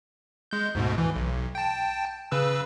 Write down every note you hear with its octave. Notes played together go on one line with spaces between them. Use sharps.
G#3 G6
D2 G#2 B2
E3
B1
G5 A5
C#3 B4 E6